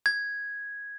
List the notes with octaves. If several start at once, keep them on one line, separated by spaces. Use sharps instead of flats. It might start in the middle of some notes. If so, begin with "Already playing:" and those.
G#6